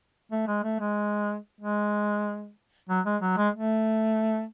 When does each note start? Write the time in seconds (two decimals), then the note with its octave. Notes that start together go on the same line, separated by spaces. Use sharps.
0.32 A3
0.48 G#3
0.64 A3
0.80 G#3
1.60 G#3
2.89 F#3
3.05 G#3
3.22 F#3
3.37 G#3
3.54 A3